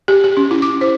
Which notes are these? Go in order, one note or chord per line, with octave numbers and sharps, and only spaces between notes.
G4
G4
C#4
E4
D6
C5